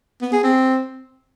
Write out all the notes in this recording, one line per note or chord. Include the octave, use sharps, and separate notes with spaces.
B3
G#4
C4